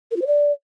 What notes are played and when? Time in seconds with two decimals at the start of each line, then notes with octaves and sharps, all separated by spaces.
0.11 A#4
0.16 F4
0.22 C5
0.27 D5